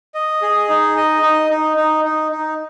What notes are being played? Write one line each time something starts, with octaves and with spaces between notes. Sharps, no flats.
D#5
G#4
D#4
D#5
D#4
D#4
D#4
D#4
D#4